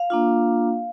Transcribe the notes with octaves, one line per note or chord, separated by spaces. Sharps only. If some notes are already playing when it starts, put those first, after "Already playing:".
Already playing: F5
A#3 D4 F4